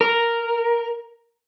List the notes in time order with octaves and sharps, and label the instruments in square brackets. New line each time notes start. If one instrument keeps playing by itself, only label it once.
[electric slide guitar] A#4